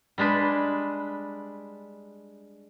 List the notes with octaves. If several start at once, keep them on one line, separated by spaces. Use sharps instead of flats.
G3 G#3 D4 B4